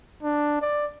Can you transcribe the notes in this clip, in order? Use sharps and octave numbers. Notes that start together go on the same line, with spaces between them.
D4
D5